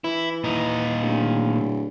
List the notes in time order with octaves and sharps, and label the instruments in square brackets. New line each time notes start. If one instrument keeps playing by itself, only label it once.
[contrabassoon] E3 [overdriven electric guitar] E4
[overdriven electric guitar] A#2 D#4
[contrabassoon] D1